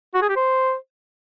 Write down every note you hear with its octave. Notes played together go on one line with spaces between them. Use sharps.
F#4
G#4
G4
C5